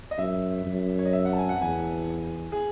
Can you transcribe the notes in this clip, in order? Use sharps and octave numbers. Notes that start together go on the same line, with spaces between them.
D#5
F#2 E5
F#2
C#5
D#5
E5
F#5
A5
G#5
F#5
E2 G#5
G#4